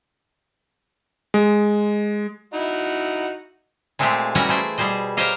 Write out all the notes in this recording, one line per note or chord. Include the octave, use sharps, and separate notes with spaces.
G#3
D#4 E4 F#4
A#2 G#3 A3 C4 G4 G#4
E3 G3 C#4 F#4 A#4 C#5
A3 G#4 C5 G5
B2 G3 G#4 C5 D#5
G4 A#4 C5 C#5 D#5 F5